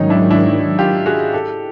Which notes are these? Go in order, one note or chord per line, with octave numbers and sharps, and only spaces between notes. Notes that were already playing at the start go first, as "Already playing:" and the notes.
Already playing: G#2 D#3 F#3 C#4 D#4
D4 E4
D4 E4
F4 G4
F#4 G#4
G4 A4